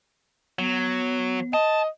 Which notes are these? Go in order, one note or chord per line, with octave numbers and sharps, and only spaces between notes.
F#3 B3
D#5 A5